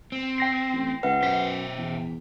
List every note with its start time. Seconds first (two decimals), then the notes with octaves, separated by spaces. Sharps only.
0.12 C4
0.38 G5 A#6 C7
0.73 A1
1.03 C#2 B4 E5 F#5
1.23 F#2 B2 C5 B6
1.78 E2